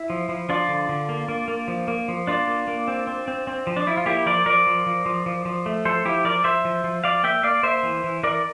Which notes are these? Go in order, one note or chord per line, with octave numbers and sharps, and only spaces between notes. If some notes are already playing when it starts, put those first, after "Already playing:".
Already playing: E4
F3
F3
F3 D4 F4
D3
D3
A#3
A#3
A#3
F3
A#3
F3
A#3 D4 F4
A#3
A#3
C4
C4
C4
C4
F3
D4
F3 E4
F4
A#3 E4 G4
F3 A#4 D5
F3 A#4 D5
F3
F3
F3
F3
F3
A3
F3 A4 C5
F3 E4 G4
F3 A#4 D5
F3 C5 E5
F3
F3
F3 D5 F5
A#3 E5 G5
A#3 D5 F5
A#3 C5 E5
E3
E3
E3 A#4 D5